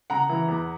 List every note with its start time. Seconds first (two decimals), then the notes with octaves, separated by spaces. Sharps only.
0.10 C#3 F#5 A#5
0.29 E3
0.48 E2